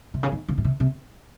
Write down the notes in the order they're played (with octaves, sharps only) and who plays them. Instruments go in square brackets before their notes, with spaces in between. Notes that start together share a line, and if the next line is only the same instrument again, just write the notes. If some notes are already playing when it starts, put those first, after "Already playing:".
[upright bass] C3
C#3
D#3
C#3
A2
C3
C3